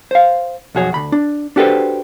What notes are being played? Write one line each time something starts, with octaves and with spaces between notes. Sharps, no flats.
C5 F5
B1 F2 F#4 G#4 C#5
D2 B5
D4
D4 F#4 G4 A4 B4 C5